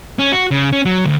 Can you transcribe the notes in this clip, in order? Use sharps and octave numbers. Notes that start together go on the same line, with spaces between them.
C#4
F#4
C#3
C#4
F#3
D2